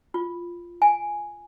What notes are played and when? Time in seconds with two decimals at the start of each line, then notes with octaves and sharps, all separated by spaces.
0.14 F4
0.82 G#5